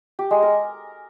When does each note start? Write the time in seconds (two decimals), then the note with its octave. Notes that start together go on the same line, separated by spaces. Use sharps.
0.19 G4
0.31 G#3
0.42 A#4